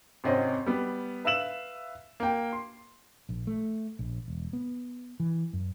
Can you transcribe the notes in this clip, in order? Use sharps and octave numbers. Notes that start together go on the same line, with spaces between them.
G#1 C3 C4 C#4 D#5
G3 B3
B4 E5 F5 E6 E7 F#7
A#3 G5
C6
A#1
A3
A#1
E1
B3
E3
F#2